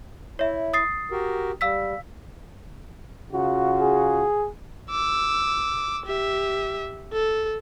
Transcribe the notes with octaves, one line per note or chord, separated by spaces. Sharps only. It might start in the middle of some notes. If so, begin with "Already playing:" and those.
E4 C#5 E5
D#6 A6 C7
F#4 G4 A#4
G3 F5 E6 B6
C#3 F4 F#4
G#4
D6 E6
G4 E5
A4